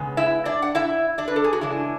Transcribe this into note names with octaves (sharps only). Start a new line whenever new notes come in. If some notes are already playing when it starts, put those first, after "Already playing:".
Already playing: C#3 G#3 B3
E4 E5
D4 D5
F#5
E4 E5
D4 D5
B4
A4
G#4
F#4
C#3 E3 G#3 D4 E4